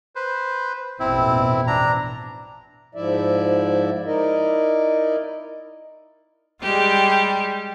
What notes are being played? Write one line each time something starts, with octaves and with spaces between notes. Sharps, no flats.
B4 C5
A1 F2 B2 C4 E4
D4 A#5
G#2 F3 E4 D5 E5
D#4 E4 A#4 D5 D#5
G3 G#3 G4